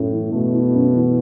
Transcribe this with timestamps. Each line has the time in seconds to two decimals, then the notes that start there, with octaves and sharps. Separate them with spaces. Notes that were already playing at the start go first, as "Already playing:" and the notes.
Already playing: F#2 A2 A3 E4
0.13 E3
0.32 B2 A3
0.53 E4
0.74 F#2
0.95 E3